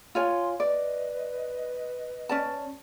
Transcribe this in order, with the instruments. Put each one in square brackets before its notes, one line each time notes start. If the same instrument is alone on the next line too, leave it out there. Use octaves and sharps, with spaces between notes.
[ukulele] F4 C#5 G#5 [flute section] C6
[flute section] B4 D#5 [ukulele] D5
[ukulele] C#4 D5 A5